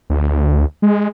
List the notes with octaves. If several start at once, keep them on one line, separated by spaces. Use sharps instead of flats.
D2
G#3